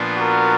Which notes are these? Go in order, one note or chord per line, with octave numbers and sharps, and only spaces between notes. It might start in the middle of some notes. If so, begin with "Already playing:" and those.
Already playing: A#2 F3 B3 D4 F4
F#4 A#4